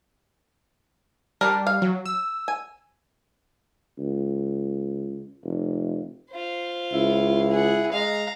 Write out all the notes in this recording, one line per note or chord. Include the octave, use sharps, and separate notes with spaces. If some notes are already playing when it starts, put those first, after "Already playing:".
G3 D4 A#4
F5
F#3
E6
G#5
C#2
F1
F4 C5
C#2 E4
G#4 F#5
G#3 F5 A#5